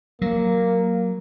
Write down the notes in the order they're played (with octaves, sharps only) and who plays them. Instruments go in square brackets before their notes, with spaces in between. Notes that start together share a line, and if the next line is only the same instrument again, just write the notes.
[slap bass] F#3 [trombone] A#3